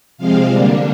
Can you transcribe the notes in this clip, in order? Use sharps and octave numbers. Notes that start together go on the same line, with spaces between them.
C3 F3 G#3 C4 F5
D3 G3 A#3 D4